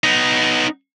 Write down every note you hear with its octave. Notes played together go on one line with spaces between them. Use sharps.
B3 D#4